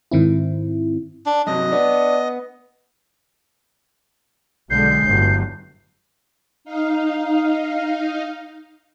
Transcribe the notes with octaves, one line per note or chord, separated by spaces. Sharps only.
G#2 D#3 C4 E4
D4
G2 C3 F#3 D#5
B3 D4
B1 D3 G#3 G6 C7
G1 A2 F#3
D#4 F5